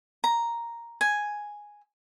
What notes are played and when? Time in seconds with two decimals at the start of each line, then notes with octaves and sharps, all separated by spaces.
0.24 A#5
1.01 G#5